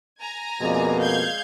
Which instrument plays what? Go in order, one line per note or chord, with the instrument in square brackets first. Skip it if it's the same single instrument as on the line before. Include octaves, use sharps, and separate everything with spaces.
[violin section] G#5 A#5
[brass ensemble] F2 A#3 [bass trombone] B2 [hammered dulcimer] G#3 D5
[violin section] F5 G6 G#6